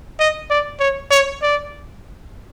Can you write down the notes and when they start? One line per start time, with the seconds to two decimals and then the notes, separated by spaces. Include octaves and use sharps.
0.19 D#5
0.50 D5
0.80 C#5
1.11 C#5
1.42 D5